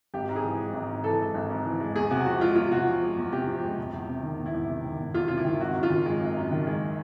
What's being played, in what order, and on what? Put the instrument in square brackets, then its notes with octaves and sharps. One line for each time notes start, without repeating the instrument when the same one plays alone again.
[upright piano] G#1 G4
G#2
G#4
E3
G#3
G#1
G#2
E3 A4
G#3
G#1
G#2
E3
G#3
E2 G#4
C3 F#4
F3 F#4
G#3 F4
E2 F4
C3 F#4
F3
G#3
E2
C3 G4
F3
G#3
E1
E2
C3
D#3
E1
E4
E2
C3
D#3
E1
E2 F4
C3 F4
E4
D#3
G#1 F#4
F#2
F4
D#3
G#3
G#1
F#2
D#3
G#3